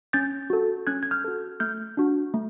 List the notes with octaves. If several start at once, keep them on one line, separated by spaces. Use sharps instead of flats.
C#4 G6 A6
F#4 A4
C#4 F#6 G#6
G#6
F6 G6
F#4 A4
A3 F6 G6
D4 F#4
A3